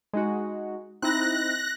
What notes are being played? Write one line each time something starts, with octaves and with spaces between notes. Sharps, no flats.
G#3 D#4 F#4
C4 D#4 E4 F#6 A#6